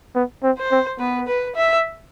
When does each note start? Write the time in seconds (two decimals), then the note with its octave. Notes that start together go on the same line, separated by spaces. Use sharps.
0.15 B3
0.43 C4
0.58 C5
0.71 C4
1.00 B3 B4
1.27 B4
1.56 E5